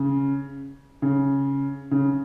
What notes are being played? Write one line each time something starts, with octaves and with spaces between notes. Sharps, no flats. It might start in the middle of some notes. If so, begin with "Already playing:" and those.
Already playing: C#3
C#3
C#3